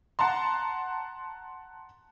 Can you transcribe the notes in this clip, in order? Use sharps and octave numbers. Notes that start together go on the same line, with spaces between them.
F#5 A5 A#5 C6